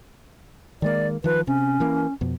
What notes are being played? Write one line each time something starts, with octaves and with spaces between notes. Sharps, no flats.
D#3 G#3 A#3 D5
D#3 F3 B4
C3 C#4
E3 A#3
F2 B2